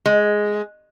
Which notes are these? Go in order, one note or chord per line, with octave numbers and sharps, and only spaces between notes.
G#3